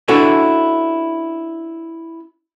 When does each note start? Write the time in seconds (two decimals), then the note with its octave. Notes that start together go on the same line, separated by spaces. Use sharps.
0.08 C#4 D4 E4 F#4 A4 B4